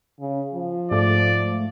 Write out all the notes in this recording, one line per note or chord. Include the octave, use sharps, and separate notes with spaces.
C#3
F3
G#2 A3 D5